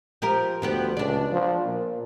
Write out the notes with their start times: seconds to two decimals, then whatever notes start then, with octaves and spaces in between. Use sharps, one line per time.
0.22 F3 G4 A#4
0.62 D2 F3 B3 G4
0.97 C#2 D4 D5
1.32 F3
1.65 A#2